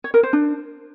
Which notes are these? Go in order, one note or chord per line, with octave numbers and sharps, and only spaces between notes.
C#5
A#4
C5
D4